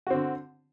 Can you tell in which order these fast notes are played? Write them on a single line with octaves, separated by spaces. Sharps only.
F#4 C4 D3